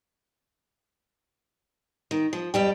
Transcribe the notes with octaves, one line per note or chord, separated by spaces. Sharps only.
D#3
F3
F2 G3 G5